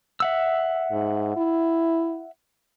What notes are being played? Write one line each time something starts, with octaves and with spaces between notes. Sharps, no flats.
E5 F#5 E6
G#2
E4